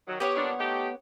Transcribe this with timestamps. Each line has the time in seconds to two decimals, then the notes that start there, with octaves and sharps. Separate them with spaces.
0.08 D#3 F#3
0.20 B3 G4 C#5 F#5
0.36 A#2 G3 D4
0.60 A3 D#4 G4